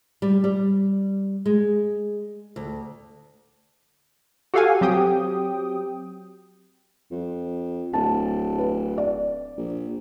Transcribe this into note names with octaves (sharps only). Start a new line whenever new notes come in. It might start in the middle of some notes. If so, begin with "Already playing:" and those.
G3
G3
G#3
D2
F#4 G4 A4 F5 F#5 G#5
F#3 C4 G4 G5 D#6
F2
D1 A5
B4
D5
A#1